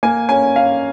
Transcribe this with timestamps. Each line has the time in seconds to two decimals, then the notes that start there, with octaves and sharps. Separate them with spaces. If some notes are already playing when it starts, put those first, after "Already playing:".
0.03 A#3 G#5
0.29 C#4 G#5
0.56 C#4 F5